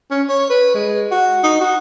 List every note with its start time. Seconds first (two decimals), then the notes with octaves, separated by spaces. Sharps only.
0.11 C#4
0.29 C#5
0.50 B4
0.74 G#3
1.11 F#4
1.43 D#4
1.61 F#4